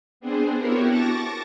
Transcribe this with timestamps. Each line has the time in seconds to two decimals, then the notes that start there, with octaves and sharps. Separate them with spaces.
0.20 B3 C4 D4 G#4 C5
0.58 B3 E4 F#4 G4 A#4 C#5
0.87 A5 C#6 D6 A6 A#6